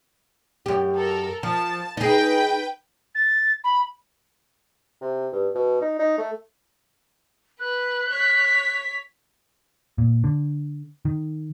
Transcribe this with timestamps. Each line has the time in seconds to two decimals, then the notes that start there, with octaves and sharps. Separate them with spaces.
0.66 F#2 G4
0.96 A4 A#4
1.43 F3 A5
1.97 D#4 G#4 B4 G5
3.15 A6
3.64 B5
5.01 C3
5.32 G2
5.55 B2
5.81 D#4
5.99 D#4
6.18 A3
7.60 B4 F#6
8.10 C#5 B6
9.98 A#2
10.24 D3
11.05 D#3